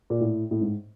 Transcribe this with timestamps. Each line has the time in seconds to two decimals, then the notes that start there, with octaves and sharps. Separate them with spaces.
0.10 A#2
0.21 A2
0.51 A2
0.61 G#2